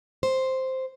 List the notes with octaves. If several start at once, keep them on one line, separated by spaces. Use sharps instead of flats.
C5